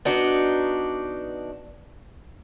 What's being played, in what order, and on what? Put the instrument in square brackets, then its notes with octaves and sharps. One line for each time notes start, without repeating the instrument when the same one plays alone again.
[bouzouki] B3 D4 D#4 F#4